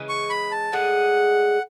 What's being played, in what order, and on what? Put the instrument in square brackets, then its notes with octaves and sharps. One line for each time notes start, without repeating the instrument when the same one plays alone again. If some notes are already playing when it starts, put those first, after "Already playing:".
Already playing: [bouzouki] C#3 E3 G#3
[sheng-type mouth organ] C#6
B5
A5
[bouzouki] A2 G#3 D4 G#4 [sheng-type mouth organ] F#5